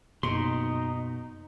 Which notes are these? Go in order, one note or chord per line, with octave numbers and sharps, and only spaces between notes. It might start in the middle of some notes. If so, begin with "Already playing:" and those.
F#2 B2 A#3 D#4 C6